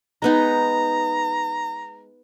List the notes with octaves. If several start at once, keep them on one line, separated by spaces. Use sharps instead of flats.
G#3 B3 D#4 A#5